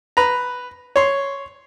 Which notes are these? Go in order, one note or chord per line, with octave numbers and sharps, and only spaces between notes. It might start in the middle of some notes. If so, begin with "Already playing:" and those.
B4 A#5
C#5 C6